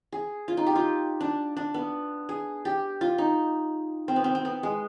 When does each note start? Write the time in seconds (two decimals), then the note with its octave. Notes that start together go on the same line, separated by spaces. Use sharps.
0.13 G#4
0.48 F4
0.57 D#4
0.67 G4
0.76 F4
1.21 D4
1.57 D4
1.74 B3
2.29 G#4
2.65 G4
3.01 F4
3.18 D#4
4.08 C4
4.16 B3
4.24 C4
4.35 C4
4.45 B3
4.63 G#3